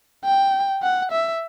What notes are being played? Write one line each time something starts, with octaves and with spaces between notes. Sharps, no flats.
G5
F#5
E5